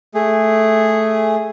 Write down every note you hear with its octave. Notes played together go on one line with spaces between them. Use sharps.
A3 G#4